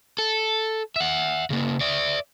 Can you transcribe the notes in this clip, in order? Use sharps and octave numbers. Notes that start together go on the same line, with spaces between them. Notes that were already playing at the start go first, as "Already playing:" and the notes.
A4
E5 F#5
C#3 A#3
D5 E5